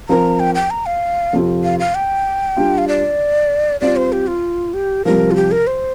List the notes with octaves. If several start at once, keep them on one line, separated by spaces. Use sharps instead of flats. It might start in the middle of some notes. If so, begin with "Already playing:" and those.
F3 C4 A#4 A#5
G5
G5
A#5
F5
F2 C3 F3 C4 F4
F5
F5
G5
G3 D4 F4
F5
D5
G3 C4 F4 D5
C5
G4
F4
G4
C2 C3 F3 A#4
F4
G4
A#4
C5